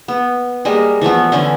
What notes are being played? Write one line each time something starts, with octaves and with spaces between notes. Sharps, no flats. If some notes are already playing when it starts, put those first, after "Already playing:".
B3
G3 G#3 A#3
E3 F3 A3 B3
D3 E3 C#4 E4